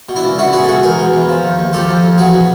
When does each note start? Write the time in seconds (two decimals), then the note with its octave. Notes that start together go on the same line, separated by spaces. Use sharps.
0.09 B2
0.16 D4 E4
0.24 C#2
0.38 C#2 E4 F#4
0.53 B2 F#4 G#4
0.64 A4
0.68 C#2 F#4 G#4
0.83 E2 G#4 A#4
0.99 B2
1.14 E2
1.29 F3
1.43 D#2
1.59 D#2
1.73 F3 G4 A4
1.88 F2
2.03 F2
2.18 E2 F#4 G#4
2.34 B2